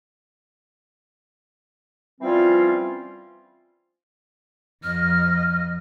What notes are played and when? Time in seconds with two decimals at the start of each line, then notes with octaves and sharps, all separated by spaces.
2.21 E3 F3 G3 C4 C#4 F4
4.83 F2 D#5 F6